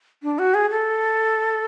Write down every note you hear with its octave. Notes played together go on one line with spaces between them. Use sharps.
D4
F#4
G#4
A4